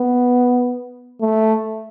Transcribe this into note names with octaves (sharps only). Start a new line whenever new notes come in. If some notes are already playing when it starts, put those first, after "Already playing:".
Already playing: B3
A3